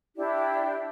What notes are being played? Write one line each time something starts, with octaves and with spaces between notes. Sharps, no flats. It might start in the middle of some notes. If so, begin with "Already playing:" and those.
D4 E4 G4